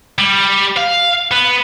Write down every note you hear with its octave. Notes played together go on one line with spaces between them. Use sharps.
G3
F5
B3